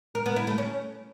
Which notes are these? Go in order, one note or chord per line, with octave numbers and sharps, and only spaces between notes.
A#4
B3
E4
A3
C#4